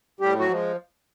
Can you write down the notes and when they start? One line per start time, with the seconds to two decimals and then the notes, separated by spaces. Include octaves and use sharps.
0.20 A2 G3 G4
0.39 F#3 F#4
0.48 F3 G#3